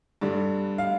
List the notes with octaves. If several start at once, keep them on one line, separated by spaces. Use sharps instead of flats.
G2 D3 G3
F5